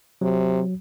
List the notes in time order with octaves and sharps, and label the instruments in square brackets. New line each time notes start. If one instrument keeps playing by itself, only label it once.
[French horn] C3 [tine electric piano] F#3